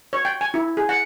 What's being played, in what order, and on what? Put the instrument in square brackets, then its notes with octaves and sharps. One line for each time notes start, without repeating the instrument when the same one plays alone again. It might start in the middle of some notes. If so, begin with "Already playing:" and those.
[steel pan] C#5
G5
G#5
E4
G#4
F#5